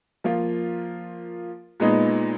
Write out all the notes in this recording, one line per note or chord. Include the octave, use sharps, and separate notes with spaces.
F3 A#3 F4
A#2 G#3 B3 D#4